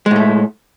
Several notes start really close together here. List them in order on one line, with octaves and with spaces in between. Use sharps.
G#3 A2 A3